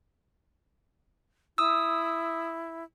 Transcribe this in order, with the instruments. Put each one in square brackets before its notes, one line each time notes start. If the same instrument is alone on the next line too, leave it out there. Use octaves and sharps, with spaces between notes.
[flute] E4 [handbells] D#6 E6